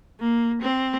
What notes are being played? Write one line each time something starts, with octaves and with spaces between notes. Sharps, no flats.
A#3
C4